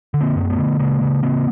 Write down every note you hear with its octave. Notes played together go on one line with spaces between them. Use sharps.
D3
A#3 C4
F#2
A3 B3
D3
C#3 G#3 A#3
C#3
C#3 A#3 C4